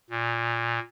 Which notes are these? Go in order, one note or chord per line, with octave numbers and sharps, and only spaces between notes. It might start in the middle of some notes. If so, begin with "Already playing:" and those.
A#2